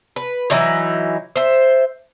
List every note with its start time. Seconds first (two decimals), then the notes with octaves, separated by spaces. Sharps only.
0.16 B4
0.50 E3 F#3 D#4 E4
1.36 C5 E5